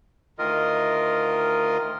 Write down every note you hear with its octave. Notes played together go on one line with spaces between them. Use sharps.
D2 D#3 F4 A#4 D#5